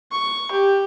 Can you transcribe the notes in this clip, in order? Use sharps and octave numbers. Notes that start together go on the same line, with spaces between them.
C#6
G4